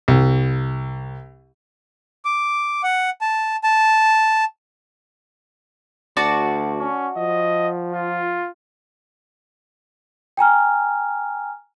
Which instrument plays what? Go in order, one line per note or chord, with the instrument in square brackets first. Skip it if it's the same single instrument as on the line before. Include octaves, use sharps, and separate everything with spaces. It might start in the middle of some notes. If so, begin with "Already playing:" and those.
[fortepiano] C2
[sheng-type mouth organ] D6
F#5
A5
A5
[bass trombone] D2 [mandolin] F#4 D5 A5
[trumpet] C#4
[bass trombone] F3 [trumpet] D#5
[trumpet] F4
[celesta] G5 G#5 A#5 F6